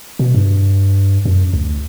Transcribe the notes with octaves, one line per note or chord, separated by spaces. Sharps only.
B2
G2
F#2
D2